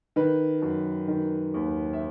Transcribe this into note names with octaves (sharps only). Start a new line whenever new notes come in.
D#3 B4
F#2
D#3
D#2
E5